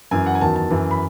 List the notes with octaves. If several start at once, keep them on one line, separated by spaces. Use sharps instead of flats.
F#2 E3 G#5
F#5
G#5
E2 D#3 F#3 A5
A5
F#2 E3
B5